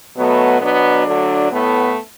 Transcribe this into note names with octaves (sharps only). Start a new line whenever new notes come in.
B2 F#3 A3 B3
B2 F#3 B3 D4
D3 F#3 A3
A2 A3 B3